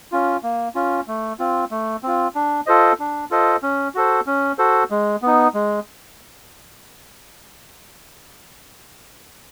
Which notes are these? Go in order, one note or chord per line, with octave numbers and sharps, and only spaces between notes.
C#4 F4
A#3
C#4 F4
A3
C4 F4
A3
C4 F4
D4
F4 A4 C5 D#5
D4
F4 A4 C5 D#5
C#4
F#4 A4 C5
C#4
F#4 A4 C5
G#3
B3 D#4
G#3